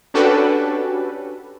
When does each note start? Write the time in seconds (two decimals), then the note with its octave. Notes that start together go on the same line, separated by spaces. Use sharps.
0.14 C#4 D4 F#4 G4 A4 B4